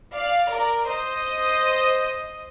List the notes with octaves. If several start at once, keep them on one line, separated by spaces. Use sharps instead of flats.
D5 F5
A#4 D5
C5 D#5